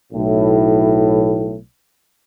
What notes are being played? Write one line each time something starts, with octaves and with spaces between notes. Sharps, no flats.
B1 A2